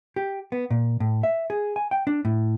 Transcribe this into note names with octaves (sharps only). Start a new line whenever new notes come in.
G4
B3
A#2
A2
E5
G#4
G#5
G5
D4
A2